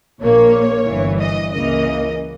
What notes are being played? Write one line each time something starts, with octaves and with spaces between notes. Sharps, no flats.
A#1 A#2 A#3 C#5
G1 G2 E3
D#5
C#2 C#3 E3 A#3 D#5